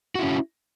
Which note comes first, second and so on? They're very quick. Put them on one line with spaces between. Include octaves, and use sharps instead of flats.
F#4 E4 C#4